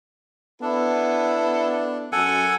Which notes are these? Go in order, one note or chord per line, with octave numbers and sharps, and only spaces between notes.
B3 D4 E4 A4
F#2 A4 F#5 G#5